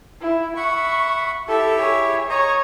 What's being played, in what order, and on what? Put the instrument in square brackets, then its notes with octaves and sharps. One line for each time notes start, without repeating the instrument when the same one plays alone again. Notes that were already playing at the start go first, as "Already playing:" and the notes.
[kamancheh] E4
[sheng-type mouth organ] E5 F#5 B5 [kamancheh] C#6
[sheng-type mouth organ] E4 G4 E5 [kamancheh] A4
[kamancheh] G#4 C#5
[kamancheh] C#5 [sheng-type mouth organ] D#5 A#5